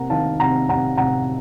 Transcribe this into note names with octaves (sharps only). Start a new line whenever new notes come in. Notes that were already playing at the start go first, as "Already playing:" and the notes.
Already playing: C3 A#3 F#5 A#5
D#3 F5 A5
C3 F#5 A#5
C3 F#5 A#5
C3 F#5 A#5